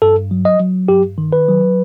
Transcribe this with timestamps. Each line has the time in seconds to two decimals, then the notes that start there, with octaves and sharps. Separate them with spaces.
0.02 G2 A4
0.31 F#3
0.45 D#5
0.60 F#3
0.88 G2 G4
1.18 D#3
1.33 B4
1.48 F#3